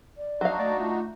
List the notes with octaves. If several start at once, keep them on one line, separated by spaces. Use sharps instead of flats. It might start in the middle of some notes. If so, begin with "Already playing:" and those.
D5
F#3 D4 D#4 F#4 F5
A3 D5
A3 F4